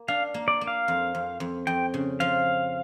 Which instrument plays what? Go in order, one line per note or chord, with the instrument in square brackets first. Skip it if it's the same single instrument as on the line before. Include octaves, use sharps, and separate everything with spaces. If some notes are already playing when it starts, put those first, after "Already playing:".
Already playing: [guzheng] A#3
[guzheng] D4 [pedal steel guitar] F5
[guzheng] A#3
[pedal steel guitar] D5
[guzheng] A#3
[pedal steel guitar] F5
[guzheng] F2
F2
F2
[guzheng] F2 [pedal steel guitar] G5
[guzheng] C#3
[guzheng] F3 [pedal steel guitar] F5